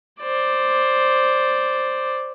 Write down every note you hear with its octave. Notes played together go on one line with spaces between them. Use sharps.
C5 D5